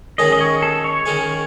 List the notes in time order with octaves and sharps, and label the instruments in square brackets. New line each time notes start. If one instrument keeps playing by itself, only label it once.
[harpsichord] D#3 G#3 C#4 G#4 [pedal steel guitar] D#5
[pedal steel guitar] D#5
C#5
A4
C#5
[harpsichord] D#3 G#3 C#4 G#4